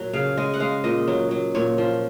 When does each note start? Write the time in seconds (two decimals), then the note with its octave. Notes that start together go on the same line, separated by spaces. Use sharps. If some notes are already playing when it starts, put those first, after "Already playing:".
Already playing: A#2 F#3
0.13 C#3 F5
0.37 G#3 D#5
0.54 F#5
0.60 G#3 F5
0.84 A#2 D#5
1.08 F#3
1.31 F#3
1.55 A#2 C#5
1.78 F3